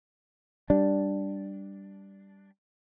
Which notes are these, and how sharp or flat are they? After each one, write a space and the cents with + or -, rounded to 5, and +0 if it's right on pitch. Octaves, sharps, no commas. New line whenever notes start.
G3 +0 D4 +0